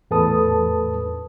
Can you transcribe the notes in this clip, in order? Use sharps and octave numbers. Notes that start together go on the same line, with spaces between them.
E2 A2 A4 B4 A5 D#6